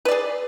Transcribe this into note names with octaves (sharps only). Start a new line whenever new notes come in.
G#4 B4 D5